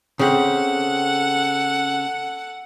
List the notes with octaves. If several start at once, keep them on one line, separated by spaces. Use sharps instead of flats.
C#3 C4 A4 F#5